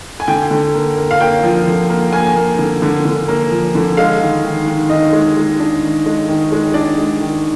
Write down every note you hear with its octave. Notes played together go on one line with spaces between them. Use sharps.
G#5
D3 G5
D3
A#3
A#3
F5
A#3 G5
F3
D3
A#3
A#3 G#5
A#3
D3
D3
D3
A#3
F3
D3
G#3 F5
D#3
D#3
D#3
D#3 D#5
G#3
G#3
D4
D#3
G#3
D#3
G#3
D4 D5
G#3
D#3